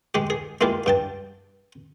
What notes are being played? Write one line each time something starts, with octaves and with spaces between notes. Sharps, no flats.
G#3 G4
G#4
G#3 A#3 E4 F4 G4
G2 G5 A5